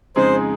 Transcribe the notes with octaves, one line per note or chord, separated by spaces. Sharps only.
F2 C#3 G#3 D#4 G#4 C5